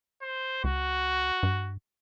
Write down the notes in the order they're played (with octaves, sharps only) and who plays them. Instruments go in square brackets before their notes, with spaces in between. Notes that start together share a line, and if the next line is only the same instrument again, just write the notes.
[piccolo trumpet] C5
[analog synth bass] C#2 [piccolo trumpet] F#4
[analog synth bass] G2